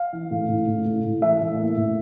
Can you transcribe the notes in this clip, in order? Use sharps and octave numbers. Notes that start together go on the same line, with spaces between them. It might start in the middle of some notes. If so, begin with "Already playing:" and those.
Already playing: F5
E3
A2
A2
A2
A2
A2
E3 E5
A2
A#3
A2